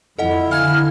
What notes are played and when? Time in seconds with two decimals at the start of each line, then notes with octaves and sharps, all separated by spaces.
0.19 F2 E4 A4 D#5 F#5
0.51 D3 F5 G#5 F6 G#6